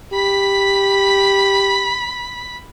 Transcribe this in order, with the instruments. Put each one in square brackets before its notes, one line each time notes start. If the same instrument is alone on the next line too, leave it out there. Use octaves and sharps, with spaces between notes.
[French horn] G4 [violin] B5 B6